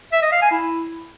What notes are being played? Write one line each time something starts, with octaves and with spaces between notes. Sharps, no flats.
E5
D#5
F5
G#5
E4